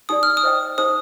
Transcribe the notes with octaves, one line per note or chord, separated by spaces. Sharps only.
D#4 G4 D5 D#6
F6
D#6
C5 D#5 G5
D#4 G4 C5 D#5 D#6